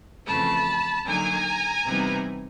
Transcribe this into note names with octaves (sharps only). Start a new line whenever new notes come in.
F2 C#3 E3 A3 A5 B5
D3 F#3 A#3 D#4 G#5 A#5
C3 E3 G3 B3 D#4